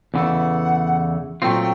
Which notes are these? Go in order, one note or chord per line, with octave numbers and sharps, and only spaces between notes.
E2 C#3 E3 A3 F#5
A#2 F#3 A3 C4 F4 G5